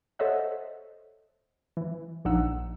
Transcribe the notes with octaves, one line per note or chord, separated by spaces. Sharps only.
A4 C5 C#5 D#5 E5 F#5
E3
A#1 F3 D4 D#4 F#5 E6